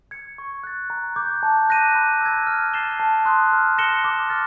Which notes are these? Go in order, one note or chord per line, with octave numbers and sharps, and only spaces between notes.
G#6 C#7
C#6
F#6 A6
A#5
D6 G6
A5
D6 F#6 A#6 D#7
B5
E6 G#6
F6
A6 C7 E7 G7
A5
C6 D#6 F#6
F6
A#6 C#7 E7 G7
D6
F6 A6